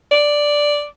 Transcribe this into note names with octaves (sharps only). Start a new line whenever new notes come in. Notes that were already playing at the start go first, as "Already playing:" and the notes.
D5